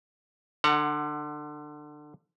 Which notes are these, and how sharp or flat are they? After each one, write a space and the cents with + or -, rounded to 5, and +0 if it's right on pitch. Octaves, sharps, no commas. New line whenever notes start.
D3 +25 F#5 +0 A#5 -40